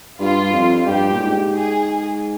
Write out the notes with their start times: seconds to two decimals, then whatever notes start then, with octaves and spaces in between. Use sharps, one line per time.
0.20 G2 F4
0.53 F2
0.85 G2 G4
1.12 A#2
1.18 G#2
1.50 G#2 G#4